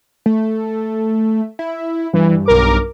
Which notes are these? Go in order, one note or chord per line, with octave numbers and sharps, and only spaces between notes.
A3
E4
G2 E3
B1 A#4 D6